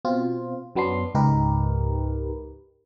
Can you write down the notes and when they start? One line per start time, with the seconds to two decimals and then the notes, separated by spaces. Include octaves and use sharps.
0.05 B2 C4 F4
0.75 F#2 F#3 B3 D4 C6
1.15 C#2 G#2 D#4 G4 A#4 B4